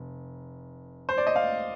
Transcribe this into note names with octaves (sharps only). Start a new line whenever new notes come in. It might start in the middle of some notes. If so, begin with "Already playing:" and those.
Already playing: F1
C5
D5
D#5
F5